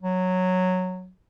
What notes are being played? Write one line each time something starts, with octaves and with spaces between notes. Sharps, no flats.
F#3